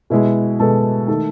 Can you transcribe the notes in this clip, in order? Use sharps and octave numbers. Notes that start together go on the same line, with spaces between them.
B2 G#3 E4
B2 G#3 A4
D#3 A3 A4